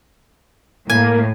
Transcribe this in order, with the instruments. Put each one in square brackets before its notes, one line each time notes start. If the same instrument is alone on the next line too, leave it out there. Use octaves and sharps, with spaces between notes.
[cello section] A2 [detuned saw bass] A#3 [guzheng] G#5